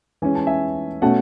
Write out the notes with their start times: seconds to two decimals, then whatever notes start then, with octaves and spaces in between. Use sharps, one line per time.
0.22 E3 G#3 C#4 G#5
0.35 A5
0.47 E5 G#5
1.02 B2 A3 C#4 F#5 A5